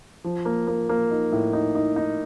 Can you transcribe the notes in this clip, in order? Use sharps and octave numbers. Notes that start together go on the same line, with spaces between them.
F3
A#3
A#3
A#3
D#4
A2
D#4
D#4
D#4